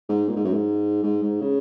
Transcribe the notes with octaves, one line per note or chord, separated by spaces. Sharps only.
G#2
A#2
G#2
F#2
G#2
G#2
G#2
C#3